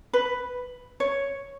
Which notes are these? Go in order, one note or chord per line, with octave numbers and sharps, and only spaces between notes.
B4
C#5